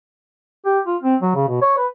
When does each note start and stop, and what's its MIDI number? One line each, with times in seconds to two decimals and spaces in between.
0.66 0.80 67
0.87 0.97 65
1.03 1.16 60
1.22 1.31 54
1.35 1.46 49
1.48 1.61 47
1.62 1.77 73
1.77 1.87 71